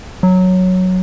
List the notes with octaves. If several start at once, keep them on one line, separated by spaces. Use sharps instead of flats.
F#3